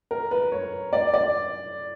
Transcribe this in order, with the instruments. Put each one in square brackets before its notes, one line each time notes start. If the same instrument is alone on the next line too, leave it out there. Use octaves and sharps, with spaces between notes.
[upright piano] A#4
B4
C#5
D5
D5